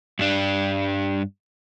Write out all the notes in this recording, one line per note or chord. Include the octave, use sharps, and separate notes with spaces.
G2 G3 D4